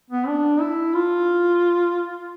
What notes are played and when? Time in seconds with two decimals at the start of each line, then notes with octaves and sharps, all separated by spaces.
0.10 B3
0.27 D4
0.60 E4
0.94 F4